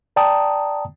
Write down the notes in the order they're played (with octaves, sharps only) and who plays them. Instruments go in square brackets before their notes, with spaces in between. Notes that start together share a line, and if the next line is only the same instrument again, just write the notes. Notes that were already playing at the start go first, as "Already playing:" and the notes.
[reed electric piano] D5 G5 A5 A#5 D#6